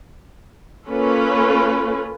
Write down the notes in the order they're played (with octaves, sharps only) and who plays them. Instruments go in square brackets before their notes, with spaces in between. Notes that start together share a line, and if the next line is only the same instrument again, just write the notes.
[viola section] A#3 C#4 F4 A4 B4